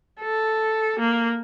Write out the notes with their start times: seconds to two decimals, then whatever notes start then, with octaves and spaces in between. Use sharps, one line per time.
0.21 A4
1.00 A#3